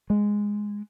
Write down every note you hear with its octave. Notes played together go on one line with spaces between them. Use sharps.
G#3